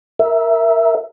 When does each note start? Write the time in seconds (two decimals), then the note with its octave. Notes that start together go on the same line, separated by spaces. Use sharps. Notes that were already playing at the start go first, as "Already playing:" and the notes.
0.19 A#4 E5